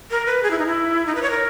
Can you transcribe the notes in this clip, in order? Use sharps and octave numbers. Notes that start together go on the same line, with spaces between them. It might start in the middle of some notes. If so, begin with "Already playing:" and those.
A#4
B4
G#4
E4
D#4
E4
D#4
B4
C#5
A#4